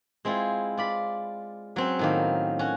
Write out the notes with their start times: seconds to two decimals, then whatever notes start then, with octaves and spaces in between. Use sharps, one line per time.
0.25 G#3 C4 E4 F4
0.77 F4 D5 B5
1.76 F#3 C4 C#4
1.99 A2 D#3 A#3
2.59 C#4 F#4